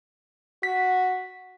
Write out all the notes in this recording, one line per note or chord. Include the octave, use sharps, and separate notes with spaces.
F#4 B6